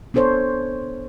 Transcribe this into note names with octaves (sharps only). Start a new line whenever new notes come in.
B3 D4 A4 C5 C#5